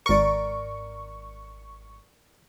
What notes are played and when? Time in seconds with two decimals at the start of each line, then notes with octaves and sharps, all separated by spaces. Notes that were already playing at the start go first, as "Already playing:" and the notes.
0.06 G#1 A#4 D5 C#6